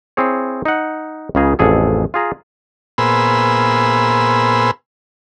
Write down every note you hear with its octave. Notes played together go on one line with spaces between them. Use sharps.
C4 E4 G#4 C#5
D#4 F#5
C#2 C#3 G#4 A#5
A1 F2 G#4 A4
F4 G#4 A#5
A#2 B3 G#4 C5 B5 E6